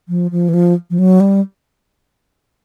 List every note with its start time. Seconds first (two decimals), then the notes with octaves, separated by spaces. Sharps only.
0.09 F3
0.31 F3
0.49 E3
0.54 F3
0.90 F3
0.99 F#3
1.20 G3